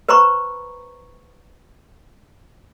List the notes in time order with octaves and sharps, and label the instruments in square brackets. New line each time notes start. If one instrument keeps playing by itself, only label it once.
[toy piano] B4 C5 A#5 B5 C#6